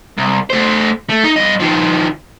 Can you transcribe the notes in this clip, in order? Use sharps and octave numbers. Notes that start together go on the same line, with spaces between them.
C2
A3 C5
A3
D#4
G2 D#5
D#3 F3